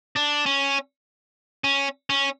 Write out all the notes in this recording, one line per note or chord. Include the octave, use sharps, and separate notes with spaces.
D4
C#4
C#4
C#4